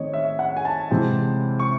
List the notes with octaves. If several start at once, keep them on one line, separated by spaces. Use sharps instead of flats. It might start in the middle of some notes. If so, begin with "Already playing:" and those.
Already playing: D#3 A3 C4 C#5 D#5
E5
F#5
G#5
A5
C3 E3 G#3 C4
C#6